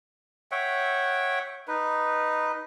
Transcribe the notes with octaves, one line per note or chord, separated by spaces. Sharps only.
C#5 E5 F#5 G5
D#4 B4